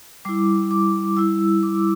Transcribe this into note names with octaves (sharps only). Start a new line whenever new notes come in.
G3 E4 D6
D6
G3 E4 E6
D6